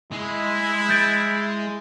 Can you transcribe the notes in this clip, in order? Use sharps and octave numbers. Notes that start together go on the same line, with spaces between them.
G#3 E4
G6 A6 D7